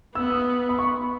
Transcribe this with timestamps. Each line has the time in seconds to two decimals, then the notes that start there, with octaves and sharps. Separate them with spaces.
0.15 B3 E6
0.30 D#6
0.69 B5
0.79 C#6